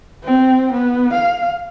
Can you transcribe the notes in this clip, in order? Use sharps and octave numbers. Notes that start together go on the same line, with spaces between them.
C4
B3
F5